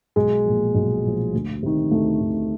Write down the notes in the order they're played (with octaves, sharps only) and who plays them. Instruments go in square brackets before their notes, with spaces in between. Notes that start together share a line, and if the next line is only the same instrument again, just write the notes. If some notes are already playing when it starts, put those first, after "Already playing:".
[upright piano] B1 G#3
A#2 F3
B1
A#2 F3
D2
C3 D#3
D2 A3
C3 D#3